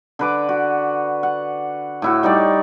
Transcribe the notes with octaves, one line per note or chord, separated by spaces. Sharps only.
D3 B4 D6
F#4
F#5
A2 E4 F#4
G3 D#4 C#5 D5